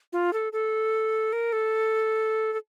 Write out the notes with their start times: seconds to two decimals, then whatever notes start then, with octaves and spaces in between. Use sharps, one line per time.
0.13 F4
0.33 A4
0.53 A4
1.33 A#4
1.53 A4
2.53 A4